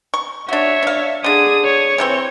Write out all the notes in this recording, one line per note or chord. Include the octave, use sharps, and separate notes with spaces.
C#6
D4 F#4 C#5 E5
D4 F5
D3 D4 G#4 D#6
C#5
C3 E3 C4